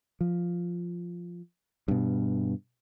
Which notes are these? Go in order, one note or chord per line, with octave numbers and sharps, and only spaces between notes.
F3
G2 B2